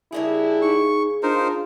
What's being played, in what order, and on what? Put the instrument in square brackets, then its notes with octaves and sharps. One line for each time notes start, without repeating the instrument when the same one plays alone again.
[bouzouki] C#3 A#3 G#4 [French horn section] G3 D4 E4
[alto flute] D#4 [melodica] C#6
[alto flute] D4 [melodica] D#4 A#4 C5 [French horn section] F4